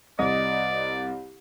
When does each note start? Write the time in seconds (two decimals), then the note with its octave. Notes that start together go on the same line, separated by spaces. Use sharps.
0.19 C2 D5 D#5